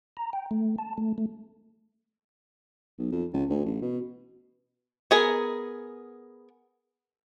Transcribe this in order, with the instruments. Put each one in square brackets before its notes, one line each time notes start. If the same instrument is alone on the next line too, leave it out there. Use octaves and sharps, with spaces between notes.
[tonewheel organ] A#5
G5
A3
A5
A3
A3
[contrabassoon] B1
F2
C#2
D2
A1
B2
[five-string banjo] B3 G#4 A#4